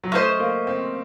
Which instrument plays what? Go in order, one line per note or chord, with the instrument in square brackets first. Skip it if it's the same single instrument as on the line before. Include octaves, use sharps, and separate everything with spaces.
[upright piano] F#3
[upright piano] A3 [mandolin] C#4 A4 C5 D#5
[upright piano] A#3
C4